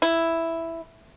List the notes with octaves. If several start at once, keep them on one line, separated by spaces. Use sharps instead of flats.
E4